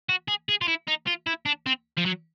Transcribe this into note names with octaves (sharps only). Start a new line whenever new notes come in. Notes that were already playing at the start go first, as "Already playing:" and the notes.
F#4
G#4
G#4
F4
E4
D#4
F4
E4
D4
C4
F3
F#3